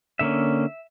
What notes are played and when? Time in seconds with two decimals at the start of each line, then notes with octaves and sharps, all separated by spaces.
0.19 D3 A#3 C#4 E5